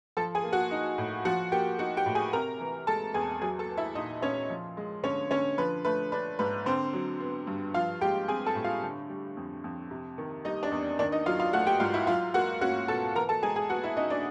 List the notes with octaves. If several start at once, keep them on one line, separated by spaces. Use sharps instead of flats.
F3 A4 A5
G#4 G#5
A#3
F#4 F#5
D#4
A2
F3 F#4 F#5
A#3 G4 G5
D#4 F#4 F#5
G4 G5
A2
G#4 G#5
C3 A#4 A#5
E3
G#3 A4 A5
E2 G#4 G#5
F#3 G#4 G#5
A4 A5
B3
E4 E5
A#2 D#4 D#5
A#2 C#4 C#5
F3
G#3
D3 C#4 C#5
D3 C#4 C#5
F3 B4
A3 B4
D4 B4
G#2 B4
D3 C4 C5
F#3
B3
G2
F3 F4 F5
G#3 G4 G5
C4 G#4 G#5
A4 A5
A2
F4 F5
D3
G3
F2
F2
C3
D#3
G3 D#4 D#5
D4 D5
E2
D#3 D4 D5
D#4 D#5
F#3 F4 F5
F4 F5
A3 F#4 F#5
G4 G5
G#2 F4 F5
E4 E5
F#3 F4 F5
A#3 F#4 F#5
C#4 F#4 F#5
B2 A4 A5
E3 A#4 A#5
A4 A5
G#3 G#4 G#5
G#4 G#5
B3 F#4 F#5
E4 E5
C#3 D#4 D#5
D4 D5